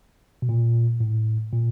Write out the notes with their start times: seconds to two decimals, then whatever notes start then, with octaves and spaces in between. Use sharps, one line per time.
0.42 B2
0.49 A#2
1.00 A2
1.53 A#2